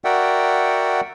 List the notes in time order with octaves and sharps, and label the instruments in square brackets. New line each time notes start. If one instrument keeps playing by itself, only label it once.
[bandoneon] F#4 A#4 D5 E5 F#5 G5